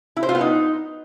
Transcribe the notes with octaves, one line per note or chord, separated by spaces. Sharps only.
E4
C5
F4
B3
D#4